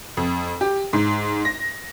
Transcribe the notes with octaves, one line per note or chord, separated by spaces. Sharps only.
F2
G4
G#2
A#6